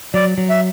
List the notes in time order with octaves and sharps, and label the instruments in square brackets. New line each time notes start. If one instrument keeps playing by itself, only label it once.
[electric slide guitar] F#3 [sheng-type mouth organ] D5
[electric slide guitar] F#3
[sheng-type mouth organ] E5